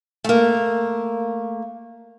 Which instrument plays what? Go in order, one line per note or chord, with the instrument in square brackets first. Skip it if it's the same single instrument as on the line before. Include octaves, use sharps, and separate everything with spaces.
[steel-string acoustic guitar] A3 A#3